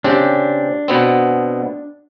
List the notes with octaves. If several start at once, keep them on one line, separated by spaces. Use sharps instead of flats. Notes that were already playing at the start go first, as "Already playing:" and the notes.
C#3 C4 D4 G4
B2 B3 C4